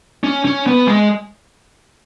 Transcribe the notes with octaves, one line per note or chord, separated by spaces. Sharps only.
C#4
C#4
B3
G#3